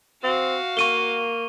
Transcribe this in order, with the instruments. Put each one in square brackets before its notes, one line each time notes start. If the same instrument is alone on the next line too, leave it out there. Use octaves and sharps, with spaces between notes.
[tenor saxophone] C4 [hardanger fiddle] F#4 F5
[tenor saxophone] A#3 [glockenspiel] C#6 D#7 G7